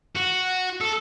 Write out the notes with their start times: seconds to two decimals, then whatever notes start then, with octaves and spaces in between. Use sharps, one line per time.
0.15 F#4
0.81 A4